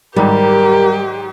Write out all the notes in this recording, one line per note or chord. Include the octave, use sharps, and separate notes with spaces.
G#2 D#3 F#3 G3 G4 A#4